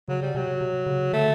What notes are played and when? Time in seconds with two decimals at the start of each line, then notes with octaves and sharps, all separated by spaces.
0.08 C#3 F#3
0.22 G3
0.35 C3 F#3
0.61 C3
0.86 C#3
1.13 D3 A3